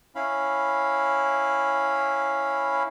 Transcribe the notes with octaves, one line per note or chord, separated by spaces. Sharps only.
C#4 E4 F5 B5